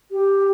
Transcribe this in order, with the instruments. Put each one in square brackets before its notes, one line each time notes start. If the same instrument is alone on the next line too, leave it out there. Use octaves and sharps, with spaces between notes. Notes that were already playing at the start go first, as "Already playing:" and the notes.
[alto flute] G4